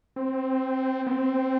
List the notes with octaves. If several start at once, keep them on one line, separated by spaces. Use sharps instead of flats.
C4
B3
C4